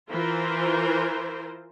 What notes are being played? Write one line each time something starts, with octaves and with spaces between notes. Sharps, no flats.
E3 F4 A#4 C5